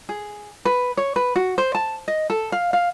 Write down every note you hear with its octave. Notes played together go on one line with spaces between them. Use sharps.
G#4
B4
C#5
B4
F#4
C5
A5
D#5
A4
F5
F5